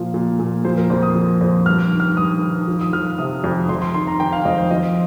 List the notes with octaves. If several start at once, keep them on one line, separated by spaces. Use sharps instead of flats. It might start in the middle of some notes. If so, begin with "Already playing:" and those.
Already playing: A#2 F3 F5
A#2
A#2
F3 C5
A#4
F2 C5
D#6
F3
F2
G2 F6
D#3
F6
G2 D#6
D#3
F3
D#6
F3 F6
C3 D#6
F2
F2 C6
C6
D#3 C6
A#5
D#3 G5
F5
F2 D#5
C5
F3 D#5